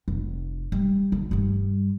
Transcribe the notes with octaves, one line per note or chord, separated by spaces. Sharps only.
F1
G3
D3
G2 G3